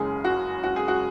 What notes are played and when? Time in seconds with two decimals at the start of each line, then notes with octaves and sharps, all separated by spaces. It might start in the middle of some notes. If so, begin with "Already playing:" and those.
Already playing: F#1 F#2 C#3 G#3 G#4
0.24 F#4
0.63 F#4
0.76 G#4
0.88 F#4